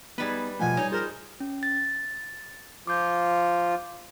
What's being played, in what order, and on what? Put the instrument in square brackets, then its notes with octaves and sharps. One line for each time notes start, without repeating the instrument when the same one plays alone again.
[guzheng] G3 B4 [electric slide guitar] B3 D#4 G#4
[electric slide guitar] B2 F3 A3 [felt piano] F4 D#5 F#5 [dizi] G#5
[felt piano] G3 [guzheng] D#4 [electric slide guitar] C#5
[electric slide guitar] F4 C5 [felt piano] G#4 [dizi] A#4
[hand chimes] C#4
A6
[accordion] F3 F4 [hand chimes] D6 G6